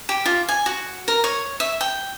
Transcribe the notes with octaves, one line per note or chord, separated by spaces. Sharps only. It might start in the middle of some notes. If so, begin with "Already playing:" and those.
G4
F4
G#5
F#4
A#4
C#5
E5
G5